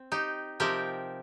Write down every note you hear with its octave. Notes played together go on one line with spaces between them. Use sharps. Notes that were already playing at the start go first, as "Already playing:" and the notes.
Already playing: C4
D#4 G4
C3 F3 C4 D#4 G4 A#4